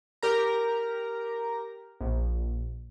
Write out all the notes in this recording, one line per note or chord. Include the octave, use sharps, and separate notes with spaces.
G4 A#4 A#5
A#1